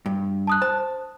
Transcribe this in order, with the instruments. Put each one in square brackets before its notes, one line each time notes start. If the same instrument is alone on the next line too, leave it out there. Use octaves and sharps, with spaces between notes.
[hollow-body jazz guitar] G2
[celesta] A5 D#6 F#6
[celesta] C5 [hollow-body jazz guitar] A5